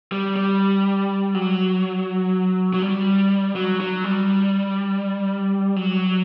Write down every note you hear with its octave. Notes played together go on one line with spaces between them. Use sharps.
G3
G3
F#3
F#3
G3
F#3
F#3
G3
F#3